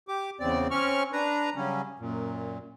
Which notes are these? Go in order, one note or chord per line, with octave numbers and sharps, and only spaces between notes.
G4 D6
E2 C#3 C4 D5
C4 C#4 C#6 F6
D4 B4 A#5
C#3 F#3 G3 C#4
F#2 A#2